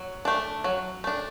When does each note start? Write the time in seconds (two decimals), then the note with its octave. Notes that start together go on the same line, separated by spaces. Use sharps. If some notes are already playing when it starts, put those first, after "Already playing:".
Already playing: F#3
0.25 A3 D4
0.64 F#3
1.04 A3 D4